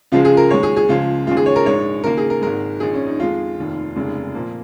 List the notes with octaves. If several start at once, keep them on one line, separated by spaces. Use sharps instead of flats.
C#2 C#3 F3 G#3 F4
G#4
A#4
D#2 D#3 G#3 C#5
G#4
G#4
C#2 C#3 F3 F4
D#2 C#3 G#3 F4
G#4
C#5
A#4
A#1 G#2 G#3 C#5
D#2 C#3 A#3 A#4
G#4
A#4
G#1 G#2 G#3 A#4
A#1 G#2 D#3 G#4
C#4
D#4
F2 D#3 G#3 F4
F1 D#2 D#3
F1 D#2 C#3 G#3
A#2 F3 A#3